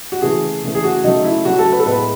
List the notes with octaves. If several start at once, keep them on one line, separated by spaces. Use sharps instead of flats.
F#4
C#3 E3 A3 G#4
C#3 E3 A3
G#4
F#4
C#3 F#3 A3 D#4
E4
C#3 F#3 A3 F#4
A4
B4
A4
A2 G#3 B3 B4